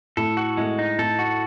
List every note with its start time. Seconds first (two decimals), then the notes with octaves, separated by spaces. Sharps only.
0.17 A2 A4
0.37 F#4
0.57 A2 G#3
0.79 D#4
0.98 A2 A4
1.19 F#4